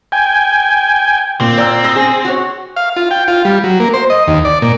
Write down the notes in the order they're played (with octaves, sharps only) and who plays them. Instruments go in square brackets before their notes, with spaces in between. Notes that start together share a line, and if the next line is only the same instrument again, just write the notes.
[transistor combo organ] G5 G#5
[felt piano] A#2 [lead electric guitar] C4
[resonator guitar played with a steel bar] A#2 [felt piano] D5 E6
[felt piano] D#6 E6 A#6
[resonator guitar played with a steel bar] G#4
F#4 C#5
[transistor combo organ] F5
F4
G5
F4
G3
F#3
A#3
C5
D#5
D#2
D5
A#2